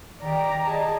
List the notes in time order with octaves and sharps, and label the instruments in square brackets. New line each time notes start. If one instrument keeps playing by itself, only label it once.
[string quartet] D#3 G4 [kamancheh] D5 A#5
[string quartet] G#4 D#5 A5